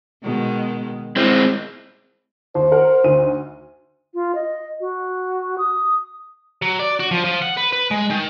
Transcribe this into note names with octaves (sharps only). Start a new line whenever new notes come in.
B2 D#3 G#3
G#3 C4 E4
D#2 C5
A#4 F#5
D2 D#4 D#7
F4
D#5
F#4
D#6
F#3
D5
F#4
F3
F3
F#5
B4
B4
G#3
D#3